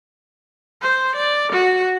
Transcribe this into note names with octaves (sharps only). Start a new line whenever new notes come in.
C5
D5
F#4